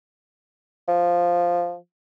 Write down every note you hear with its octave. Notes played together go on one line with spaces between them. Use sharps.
F3